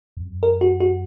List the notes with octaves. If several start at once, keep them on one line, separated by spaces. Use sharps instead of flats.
F2
F#2
A#4
F#4
F#4